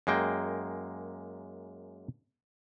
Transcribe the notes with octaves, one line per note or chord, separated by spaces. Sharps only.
F#2 G#3 A#3 G5